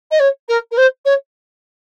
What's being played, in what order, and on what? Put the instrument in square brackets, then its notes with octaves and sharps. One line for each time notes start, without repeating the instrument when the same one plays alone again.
[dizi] D#5
C#5
A#4
A#4
C5
C#5